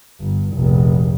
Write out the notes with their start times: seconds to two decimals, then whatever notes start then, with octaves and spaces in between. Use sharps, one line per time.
0.20 G1
0.55 F1 A#1